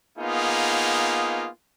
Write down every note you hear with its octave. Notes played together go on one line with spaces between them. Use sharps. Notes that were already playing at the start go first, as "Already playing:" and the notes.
A#3 B3 D#4 F4 G#4